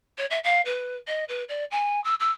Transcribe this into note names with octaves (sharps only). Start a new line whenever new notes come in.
C#5
E5
F5
B4
D#5
B4
D5
G#5
E6
E6